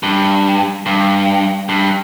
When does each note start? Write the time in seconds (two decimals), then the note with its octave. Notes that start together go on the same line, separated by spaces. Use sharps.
0.03 G2
0.86 G2
1.69 G2